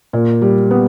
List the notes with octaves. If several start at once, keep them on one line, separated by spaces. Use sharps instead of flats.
A#2
G3
B3